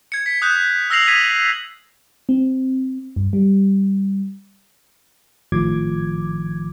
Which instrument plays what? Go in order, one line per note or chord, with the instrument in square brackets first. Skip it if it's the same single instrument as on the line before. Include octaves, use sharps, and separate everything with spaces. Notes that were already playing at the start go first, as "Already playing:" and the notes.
[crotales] G#6 C#7
B6
D#6 F#6 G6
E6 F6 A#6 C7 F7 F#7
D#6 G#6 B6 D#7 F7
[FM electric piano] C4
G2
G3
G#1 A2 D#3 F3 D6 G#6